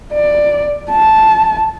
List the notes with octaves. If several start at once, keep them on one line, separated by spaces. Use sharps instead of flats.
D5
A5